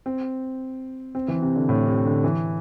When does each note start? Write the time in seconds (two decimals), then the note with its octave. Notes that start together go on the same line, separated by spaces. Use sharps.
0.06 C4
1.15 C4
1.28 E3
1.42 C3
1.56 D3
1.69 A2
1.87 C3
2.05 D3
2.24 E3